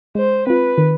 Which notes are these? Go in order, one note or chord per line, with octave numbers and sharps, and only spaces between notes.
G#3 C5
C4 F4 B4
D#3